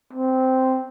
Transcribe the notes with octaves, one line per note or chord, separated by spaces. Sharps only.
C4